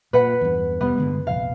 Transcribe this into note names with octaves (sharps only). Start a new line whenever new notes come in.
A#2 B4 F#5
E2 G2
F1 G3 B3
G2 D3 G#3
F1 A#1 F5